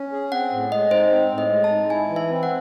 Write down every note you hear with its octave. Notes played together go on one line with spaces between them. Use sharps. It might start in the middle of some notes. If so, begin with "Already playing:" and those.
Already playing: C#4
G#4
C4 F#5
A2
G#3 D#5
D#4 C5
C4
A2
D#5
G#3
A5
D#4
E4 G#5
E3
E5
C4
F#5